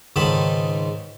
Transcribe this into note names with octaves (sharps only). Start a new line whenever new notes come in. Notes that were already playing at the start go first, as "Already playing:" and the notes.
C#2 G#2 D#3 G#3 A5 B5